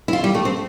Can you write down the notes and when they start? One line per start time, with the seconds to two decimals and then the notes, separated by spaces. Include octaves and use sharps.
0.08 E4
0.13 F4
0.24 G3
0.34 A3
0.45 C4